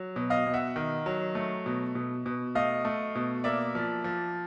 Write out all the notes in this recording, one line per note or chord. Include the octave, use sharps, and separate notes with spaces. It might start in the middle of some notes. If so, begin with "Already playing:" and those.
Already playing: F#3
B2
D#5 F5
B2
E5 F#5
D#3
F#3
A3
B2
B2
B2
A3 D#5 F5
A3
B2
A#3 D5 E5
F3
F3